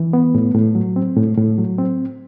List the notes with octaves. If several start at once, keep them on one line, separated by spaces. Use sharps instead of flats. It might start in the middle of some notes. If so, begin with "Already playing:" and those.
Already playing: E3
B3
A2
A2
F#3
C4
A2
A2
F#3
C4